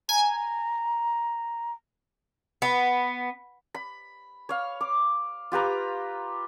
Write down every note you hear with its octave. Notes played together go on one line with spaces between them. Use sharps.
G#5 A#5
B3
B5
C#5 F5
D6
F4 G4 B4 A#5